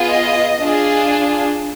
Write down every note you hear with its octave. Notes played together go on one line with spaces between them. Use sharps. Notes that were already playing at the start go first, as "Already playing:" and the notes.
Already playing: B3 F4 G#4
D#5
D4 F4 G#4